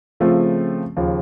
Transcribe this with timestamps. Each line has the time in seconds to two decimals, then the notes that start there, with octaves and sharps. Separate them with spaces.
0.20 C#3 F3 A3 C4 F4
0.96 D#2 C#3 F3